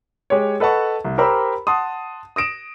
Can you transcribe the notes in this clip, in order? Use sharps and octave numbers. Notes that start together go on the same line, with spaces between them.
G#3 G4 C#5
A4 B4 D#5 F#5 A5 C#6
C2
G4 A#4 C5 A#5 B5 E6
F#5 A5 C6 D#6
D#6 A#6 D7 E7